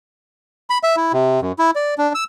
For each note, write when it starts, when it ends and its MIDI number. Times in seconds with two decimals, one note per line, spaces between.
0.70 0.78 83
0.83 0.96 76
0.96 1.12 64
1.13 1.41 48
1.41 1.52 42
1.59 1.71 64
1.76 1.94 74
1.98 2.13 62
2.15 2.24 88